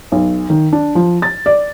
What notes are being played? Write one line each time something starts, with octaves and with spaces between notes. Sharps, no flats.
B1
D#3
D4
F3
A6
D5